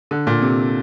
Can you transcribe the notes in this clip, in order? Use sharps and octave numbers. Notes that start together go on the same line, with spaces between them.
D3
A#2
C3